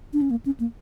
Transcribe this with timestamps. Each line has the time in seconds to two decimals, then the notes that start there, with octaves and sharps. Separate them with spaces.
0.13 D4
0.22 C#4
0.31 A#3
0.46 C#4
0.60 A#3